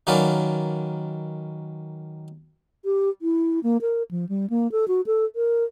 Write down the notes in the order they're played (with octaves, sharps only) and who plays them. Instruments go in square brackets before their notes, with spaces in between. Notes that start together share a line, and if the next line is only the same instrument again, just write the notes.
[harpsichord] D#3 F#3 A#3 C#4 B4 D5
[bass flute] G4
E4
A#3
A#4
F3
G3
A#3
A4
F#4
A4
A#4